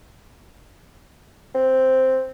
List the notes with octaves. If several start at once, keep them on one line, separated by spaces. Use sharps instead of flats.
C4